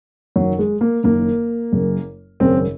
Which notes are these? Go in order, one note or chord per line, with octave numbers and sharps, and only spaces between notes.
F#1 F#2 D#3 F#3
G#3
A#3
F#1 F#2 D#3 A#3
F#1 F#2 C#3
G#1 F#2 C#3 C4